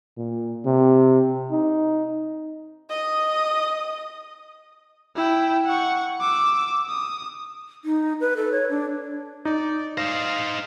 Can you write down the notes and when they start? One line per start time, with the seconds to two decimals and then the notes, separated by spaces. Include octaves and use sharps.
0.17 A#2
0.66 C3
1.51 D#4
2.90 D#5 D#6
5.15 E4 G5
5.66 F#5 C#6
6.20 D6 E6
6.89 D#6
7.85 D#4
8.20 B4
8.37 A4
8.52 C#5
8.70 D4
9.45 D#4 D5
9.97 D#4 C5 F5 A#6